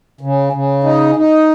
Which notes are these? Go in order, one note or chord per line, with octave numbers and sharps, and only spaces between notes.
C#3
C#3
D#4
D#4